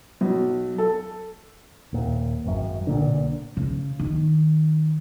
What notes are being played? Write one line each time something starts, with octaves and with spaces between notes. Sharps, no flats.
B1
A4
D#1 A#2
G#1 F#2
B1 A#2 D3
C#3
D#3